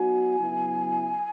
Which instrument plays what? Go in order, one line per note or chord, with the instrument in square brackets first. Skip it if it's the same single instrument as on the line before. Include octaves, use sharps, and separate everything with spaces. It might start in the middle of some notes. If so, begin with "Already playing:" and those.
Already playing: [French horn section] F#3 B3 D#4 F#4 [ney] G#5
[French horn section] C#3 F#3 B3 E4